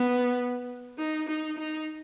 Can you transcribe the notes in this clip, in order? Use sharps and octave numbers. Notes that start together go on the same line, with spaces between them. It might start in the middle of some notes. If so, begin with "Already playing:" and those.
Already playing: B3
D#4
D#4
D#4